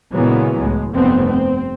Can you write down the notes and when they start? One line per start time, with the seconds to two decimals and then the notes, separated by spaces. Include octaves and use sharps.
0.13 A#2 C#3 E3 F#3 G#3 B3
0.58 C#2 A2 G#3
0.92 F1 G2 A3 B3 C4
1.27 C4